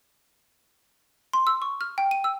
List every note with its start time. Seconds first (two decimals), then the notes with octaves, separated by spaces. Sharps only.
1.33 C6
1.47 E6
1.62 C#6
1.81 F6
1.98 G5
2.11 D#7
2.24 E6